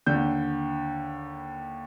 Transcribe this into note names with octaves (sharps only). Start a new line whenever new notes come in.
D#2 D3 G6